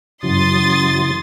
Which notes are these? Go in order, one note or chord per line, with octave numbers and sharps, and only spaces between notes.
F#2 C#3 E3 F#3 C6 D#6 A6